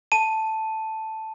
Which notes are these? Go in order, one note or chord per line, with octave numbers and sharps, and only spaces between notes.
A5 D#7